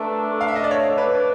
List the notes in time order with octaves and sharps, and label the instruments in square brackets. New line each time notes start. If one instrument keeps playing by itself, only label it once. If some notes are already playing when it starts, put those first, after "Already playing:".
Already playing: [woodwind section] A3 D4 [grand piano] A#4 B4
[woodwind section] A3
[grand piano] F5
E5
D#5
D5
[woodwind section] D4 [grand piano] C#5
[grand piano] B4
[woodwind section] D4